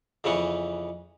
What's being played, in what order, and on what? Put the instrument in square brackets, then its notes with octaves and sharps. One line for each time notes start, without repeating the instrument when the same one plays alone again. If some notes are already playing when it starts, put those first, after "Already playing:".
[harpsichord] F2 C#3 E3 B3 C#6